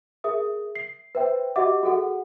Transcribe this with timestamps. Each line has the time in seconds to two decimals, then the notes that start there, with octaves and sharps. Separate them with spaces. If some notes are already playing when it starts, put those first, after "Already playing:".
0.24 G#4 A#4 E5 D#6
0.75 C7
1.15 B4 C5 E5 G5
1.56 F#4 G4 D#5 E5 F#5 D6
1.83 F#4 G#4 A4 F#5